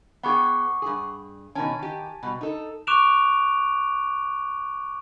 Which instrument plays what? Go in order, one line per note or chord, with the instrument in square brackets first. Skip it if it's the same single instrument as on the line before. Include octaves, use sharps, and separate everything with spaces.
[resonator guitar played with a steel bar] B3 G#4 G5 [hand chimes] F#5 C#6 D6
[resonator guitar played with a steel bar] G2 G#4
[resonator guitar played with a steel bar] B2 D#3 C#4 [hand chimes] G#5 A5
[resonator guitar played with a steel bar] D#3 G4
B2 G3
D#4 A4
[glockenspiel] C#6 D6 F#6 D7 E7 F7